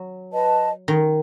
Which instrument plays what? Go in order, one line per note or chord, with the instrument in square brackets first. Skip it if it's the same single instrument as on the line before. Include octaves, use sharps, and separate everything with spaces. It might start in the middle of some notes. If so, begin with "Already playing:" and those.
Already playing: [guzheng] F#3
[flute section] B4 D#5 A5
[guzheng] D#3